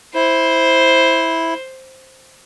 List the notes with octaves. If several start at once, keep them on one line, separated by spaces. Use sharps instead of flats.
E4 C5